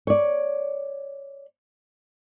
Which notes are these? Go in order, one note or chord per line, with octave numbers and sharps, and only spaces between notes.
C#5 D5